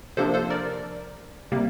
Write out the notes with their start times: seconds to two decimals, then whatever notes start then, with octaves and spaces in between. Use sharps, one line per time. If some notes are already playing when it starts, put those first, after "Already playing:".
0.17 C3 F3 A#3 D4 A4 C5
0.34 A4 C5
0.50 A#4 D5
1.52 C3 G3 A#3